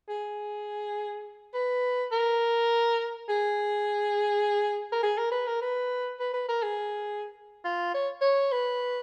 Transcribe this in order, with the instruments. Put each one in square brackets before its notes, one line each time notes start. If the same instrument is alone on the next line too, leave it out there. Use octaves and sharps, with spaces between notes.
[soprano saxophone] G#4
B4
A#4
G#4
A#4
G#4
A#4
B4
A#4
B4
B4
B4
A#4
G#4
F4
C#5
C#5
B4